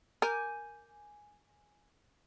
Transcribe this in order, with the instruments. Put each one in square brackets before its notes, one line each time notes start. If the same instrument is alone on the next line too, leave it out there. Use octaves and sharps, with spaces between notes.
[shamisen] A#4 [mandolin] G#5 D6 G6